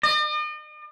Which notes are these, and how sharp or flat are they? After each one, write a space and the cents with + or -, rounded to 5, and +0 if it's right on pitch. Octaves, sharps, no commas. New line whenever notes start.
D#5 -45